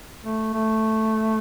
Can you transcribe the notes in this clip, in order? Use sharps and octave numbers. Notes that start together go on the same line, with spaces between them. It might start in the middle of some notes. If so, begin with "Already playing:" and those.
A3
A3